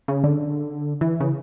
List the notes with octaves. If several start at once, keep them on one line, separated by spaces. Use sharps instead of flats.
C#3
D3
E3
C#3